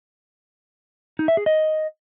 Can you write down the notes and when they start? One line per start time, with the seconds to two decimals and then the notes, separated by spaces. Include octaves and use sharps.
1.19 D#4
1.28 E5
1.37 G#4
1.46 D#5